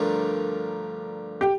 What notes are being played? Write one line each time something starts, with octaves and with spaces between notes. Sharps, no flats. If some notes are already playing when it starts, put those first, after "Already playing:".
Already playing: G2 D3 F3 A3 A#4
G4